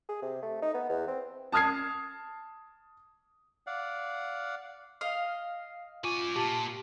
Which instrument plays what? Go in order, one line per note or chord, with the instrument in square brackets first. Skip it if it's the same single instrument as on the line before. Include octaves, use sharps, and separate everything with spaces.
[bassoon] G#4
C3
A3
D#4
B3
E2
C4
[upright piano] A5 D#6 F6 G#6 C7
[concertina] D5 F5 F#5
[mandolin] D#5 F5 [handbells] F6 C7
[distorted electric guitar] F#2 G#5 [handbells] F4 C#6 D6
[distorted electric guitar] A#2 [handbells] G4 [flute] A5